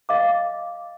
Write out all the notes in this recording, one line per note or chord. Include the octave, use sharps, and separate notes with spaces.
D#5 F5 D6